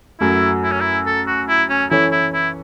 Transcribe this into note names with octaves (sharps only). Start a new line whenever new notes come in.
F#2 F#3 A3 E4
E4
C#4
E4
A4
F#4
E4
C#4
E3 C#4 E4 A4 C#5
E4
E4